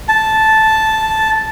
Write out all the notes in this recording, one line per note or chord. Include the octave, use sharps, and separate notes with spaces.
A5